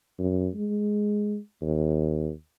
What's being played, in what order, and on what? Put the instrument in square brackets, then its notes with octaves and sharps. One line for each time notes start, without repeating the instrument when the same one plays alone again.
[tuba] F#2
G#3
D#2